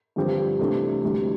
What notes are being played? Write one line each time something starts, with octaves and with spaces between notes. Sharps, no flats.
G2 D3 F3 C4 G4
C3 E3 A3 D4 F4
D2 C3 E3 G3 D4